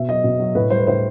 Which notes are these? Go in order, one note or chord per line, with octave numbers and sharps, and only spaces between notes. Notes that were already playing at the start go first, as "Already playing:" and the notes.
Already playing: B2 E5
F#3 D#5
B2
F#3
A2 B4
G3 C5
B4
A2 C5